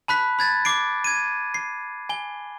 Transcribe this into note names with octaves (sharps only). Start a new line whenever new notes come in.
A5 B5 F#6 B6
B5 G#6 A6
D6 C7 D7
G#6 D#7
C7
G#5 G7